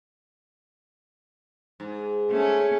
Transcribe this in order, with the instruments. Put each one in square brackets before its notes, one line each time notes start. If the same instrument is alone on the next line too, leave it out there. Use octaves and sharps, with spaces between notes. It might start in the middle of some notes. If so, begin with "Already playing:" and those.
[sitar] G#2
[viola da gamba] A3 C#4